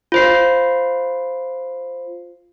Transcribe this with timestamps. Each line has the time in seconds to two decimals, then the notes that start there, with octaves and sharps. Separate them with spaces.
0.12 F4 C5 C7